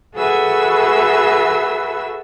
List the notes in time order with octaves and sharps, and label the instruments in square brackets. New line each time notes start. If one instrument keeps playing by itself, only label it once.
[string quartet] F#4 G#4 A4 B4 E5 E6